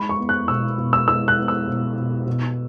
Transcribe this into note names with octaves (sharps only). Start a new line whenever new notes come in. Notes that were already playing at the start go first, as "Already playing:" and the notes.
Already playing: G#3 B5
C#6
B3
F#6
B2 E6
B2
E6
G#3 E6
F#6
B3
E6
B2
B2
B2